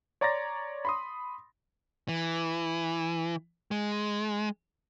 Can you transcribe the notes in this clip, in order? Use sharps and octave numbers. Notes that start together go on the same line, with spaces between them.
C#5 D5 A#5 C6 A6 A#6
B5 C6 D#6
E3
G#3